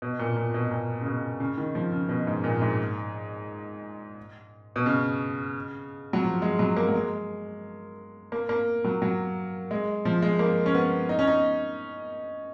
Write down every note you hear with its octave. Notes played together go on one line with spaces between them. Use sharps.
B2
A#2
A#2
B2
A#2
C#3
B2
C#3
D#3
F3
C#3
B2
G#2
A#2
G#2
B2
C#3
F#3
F3
G#3
F#3
A#3
F#3
G#3
A#3
A#3
F#3
F#3
G#3
F3
G#3
A#3
C#4
B3
D#4
C#4
D#4